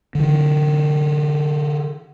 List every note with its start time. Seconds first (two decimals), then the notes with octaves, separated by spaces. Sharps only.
0.15 D3 E3